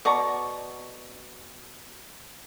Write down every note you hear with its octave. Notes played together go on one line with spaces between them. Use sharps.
B2 D5 A#5 C#6